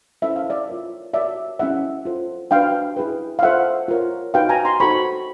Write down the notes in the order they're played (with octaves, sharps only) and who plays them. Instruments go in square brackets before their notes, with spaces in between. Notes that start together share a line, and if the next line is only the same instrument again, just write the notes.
[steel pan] C#4 E4 A4 C5 E5
F5
D5 E5
F4 A#4 C#5
F#4 A#4 C#5 D5 E5
C#4 E4 G#4 E5 F#5
F4 A4 C5
D4 F#4 B4 F5 G5
E4 G#4 B4
F5
F4 A4 C5 E5 F#5
F4 A#4 C#5
D#4 F#4 B4 F5 G5
G#5 A#5
A#5 C6
D#4 F#4 A4 C5 B5 C#6